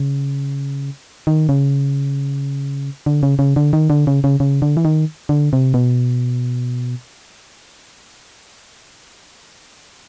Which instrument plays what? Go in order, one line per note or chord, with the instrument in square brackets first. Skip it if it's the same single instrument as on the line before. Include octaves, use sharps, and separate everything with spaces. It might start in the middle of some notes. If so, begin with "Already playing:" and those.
Already playing: [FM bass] C#3
D#3
C#3
D3
C#3
C#3
D3
D#3
D3
C#3
C#3
C#3
D3
E3
D#3
D3
C3
B2